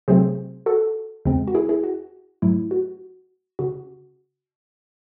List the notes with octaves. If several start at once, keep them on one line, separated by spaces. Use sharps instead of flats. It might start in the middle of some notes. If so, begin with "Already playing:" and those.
C3 F#3 A3 C4 G#4 C5
F#4 A4
E2 C#3 G#3 C4
F#4
E4 G#4
E4 G#4
F#4
G#2 F#3 A3 E4
F#4
C#3 F#4